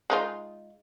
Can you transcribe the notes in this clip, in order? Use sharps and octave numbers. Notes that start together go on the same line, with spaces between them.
G#3 D#4 F4